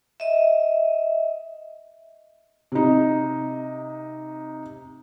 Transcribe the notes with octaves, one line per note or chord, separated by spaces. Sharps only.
D#5 E5
C3 D#4